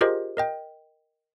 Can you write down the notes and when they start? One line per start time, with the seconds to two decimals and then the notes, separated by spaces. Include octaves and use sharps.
0.01 F4 G4 G#4 A#4 C5 D#5
0.37 A#4 D#5 G5